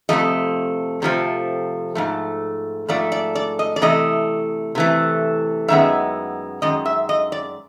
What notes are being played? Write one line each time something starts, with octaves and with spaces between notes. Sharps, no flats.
F2 C3 F3 A3 D#5
F2 C3 F3 A3
G#2 F3 A3
G#2 F3 A3 D5
D5
D5
D#5
D5
C3 E3 A3 D#5
C3 E3 A3
F#2 D#3 G#3 B3 E5
F#2 D#3 G#3 D#5
E5
D#5
D5